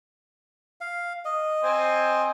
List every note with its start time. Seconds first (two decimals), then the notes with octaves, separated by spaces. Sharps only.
0.81 F5
1.25 D#5
1.64 C4 C5 G#5